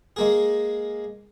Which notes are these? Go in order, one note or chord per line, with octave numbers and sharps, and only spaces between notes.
G#3 A#3 G#4